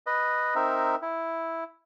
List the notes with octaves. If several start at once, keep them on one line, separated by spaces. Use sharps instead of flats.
B4 D#5
C4 D#4 A#4 E5
E4